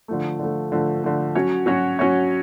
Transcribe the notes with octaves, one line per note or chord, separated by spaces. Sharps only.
D3 F3 A3
D3 F3 A3
D3 F3 A3
D3 F3 A3
F#3 C#4 F#4 C#5
F#3 C#4 F#4 C#5
F#3 C#4 F#4 C#5